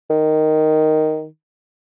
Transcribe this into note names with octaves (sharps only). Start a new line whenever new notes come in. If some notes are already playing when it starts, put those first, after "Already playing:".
D#3